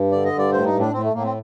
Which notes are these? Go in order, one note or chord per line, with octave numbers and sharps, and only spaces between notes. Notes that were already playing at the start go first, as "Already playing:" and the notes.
Already playing: G2
D3 D5
D#5
G2
D5
A2 C5
D#4
A2
D4
A2 C4
A3
A2 A#3
C4